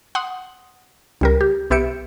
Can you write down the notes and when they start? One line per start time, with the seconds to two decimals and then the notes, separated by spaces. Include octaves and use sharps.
0.15 F#5 C6 D#6
1.21 C#2 G3 A#4
1.41 G4
1.70 B1 B3 G4 E5 C#7 D7